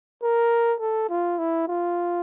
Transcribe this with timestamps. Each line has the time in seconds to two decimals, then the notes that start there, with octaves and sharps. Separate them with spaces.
0.23 A#4
0.80 A4
1.10 F4
1.39 E4
1.68 F4